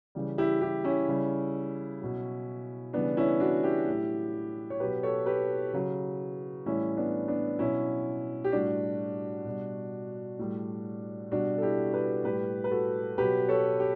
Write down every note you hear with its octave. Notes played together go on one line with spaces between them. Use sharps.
C#3 E3 G3
E4 G4
E4 G4
C#4 E4
C#3 G3
B2 F#3
C#3 E3 G3 B3 D4
C#4 E4
D4 F#4
E4 G4
A2 F#3
C#5
B2 F#3 G4 B4
A4 C#5
G4 B4
C#3 F#3
A2 E3 G3 C#4 E4
B3 D4
B3 D4
B2 F#3 C#4 E4
G4
A2 G3 D4 F#4
B2 G3
A2 G3
B2 G3 D4 F#4
A4
E4 G4
G4 B4
A2 G3 G4 B4
B4
F#4 A4
B2 F#3 G4 B4
A4 C#5
G4